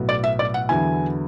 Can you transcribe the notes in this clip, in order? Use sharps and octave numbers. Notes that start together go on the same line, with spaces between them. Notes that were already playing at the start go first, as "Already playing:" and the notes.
Already playing: B1 A2 F#3 B3
D5
E5
D5
F#5
E2 D3 F#3 B3 E4 G#5